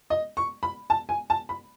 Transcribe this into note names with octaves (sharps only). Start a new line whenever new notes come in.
D#5
C#6
B5
A5
G#5
A5
B5